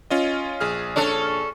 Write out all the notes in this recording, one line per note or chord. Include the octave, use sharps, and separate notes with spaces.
C#4 F4 D#5
A#1 G#4 F6
C#4 D4 A4